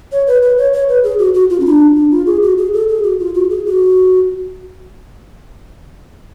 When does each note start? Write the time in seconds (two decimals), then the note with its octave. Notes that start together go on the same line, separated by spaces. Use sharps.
0.12 C#5
0.27 B4
0.42 B4
0.58 C#5
0.73 C#5
0.89 B4
1.04 G#4
1.19 F#4
1.34 F#4
1.50 F4
1.60 C#4
1.66 D4
1.96 D4
2.11 F4
2.26 G#4
2.42 F#4
2.58 G#4
2.73 A4
2.88 G#4
3.04 F#4
3.19 F4
3.35 F#4
3.50 G#4
3.66 F#4